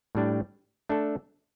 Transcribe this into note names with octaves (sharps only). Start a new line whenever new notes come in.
A2 G3 D4
A3 D4 A4